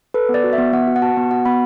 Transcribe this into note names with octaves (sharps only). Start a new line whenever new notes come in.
A4 B4
B3
D5
F#4
E5
B3
B3 F#5
F#4
F#5
F#4 A5
B3
F#4 F#5
B3 B5